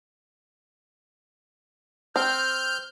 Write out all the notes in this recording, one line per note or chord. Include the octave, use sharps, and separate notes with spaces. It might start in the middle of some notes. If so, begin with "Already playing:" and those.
C4 F6 G6